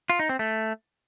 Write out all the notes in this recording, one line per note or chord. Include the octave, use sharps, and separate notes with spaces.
F4
D#4
C4
A3